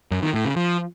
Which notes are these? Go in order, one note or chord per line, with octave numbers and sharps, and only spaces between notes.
F#2
D#3
A2
C#3
F3